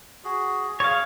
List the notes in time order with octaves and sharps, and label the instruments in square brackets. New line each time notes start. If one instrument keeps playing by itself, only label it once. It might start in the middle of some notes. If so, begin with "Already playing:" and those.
[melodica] F#4 G#4
[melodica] G#4 [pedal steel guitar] C#5 F5